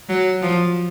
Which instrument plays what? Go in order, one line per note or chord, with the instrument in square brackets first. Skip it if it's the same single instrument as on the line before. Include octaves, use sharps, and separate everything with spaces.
[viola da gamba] F#3
F3